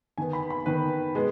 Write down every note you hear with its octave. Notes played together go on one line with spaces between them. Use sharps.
D#3 B3 G#5
B5
B5
D#3 B3 B4
B2 G#3 B3